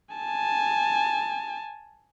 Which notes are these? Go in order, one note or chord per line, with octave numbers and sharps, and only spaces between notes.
G#5 A5